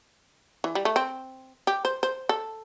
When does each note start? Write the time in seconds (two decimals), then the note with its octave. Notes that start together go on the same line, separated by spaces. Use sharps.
0.64 E3
0.75 G3
0.85 A3
0.96 C4
1.67 G4
1.85 C5
2.03 C5
2.29 A4